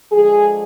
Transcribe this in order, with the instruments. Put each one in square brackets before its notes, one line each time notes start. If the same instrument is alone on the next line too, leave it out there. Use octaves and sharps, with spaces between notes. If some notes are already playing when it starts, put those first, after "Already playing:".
[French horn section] D3 F3 G#3 G#4